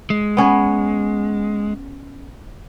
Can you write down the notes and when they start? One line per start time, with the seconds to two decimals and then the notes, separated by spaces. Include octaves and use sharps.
0.10 G#3
0.37 B3 C#4 C#5